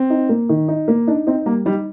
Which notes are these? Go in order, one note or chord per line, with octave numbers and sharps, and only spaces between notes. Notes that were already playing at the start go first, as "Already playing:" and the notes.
Already playing: C4
D#4
A#3
D#3
D#4
A#3
D4 D#4
C4 D#4
G3 A#3
G3 D#4